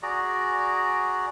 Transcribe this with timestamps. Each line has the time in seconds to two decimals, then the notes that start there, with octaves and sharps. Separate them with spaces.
0.02 F#4 G#4 D5 A#5